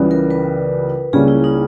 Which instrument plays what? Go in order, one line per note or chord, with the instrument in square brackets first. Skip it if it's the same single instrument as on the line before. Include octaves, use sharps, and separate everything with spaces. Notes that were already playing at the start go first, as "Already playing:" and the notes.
Already playing: [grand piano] C#2 C#3 E3 G3 B3
[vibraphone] A#4
B4
[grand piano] C#2 C#3 G3 A#3 C#4 [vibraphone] G#4
[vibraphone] E4
D#4